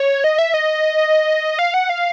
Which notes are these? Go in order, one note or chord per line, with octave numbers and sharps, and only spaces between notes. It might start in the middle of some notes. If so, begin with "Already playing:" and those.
Already playing: C#5
D#5
E5
D#5
F5
F#5
F5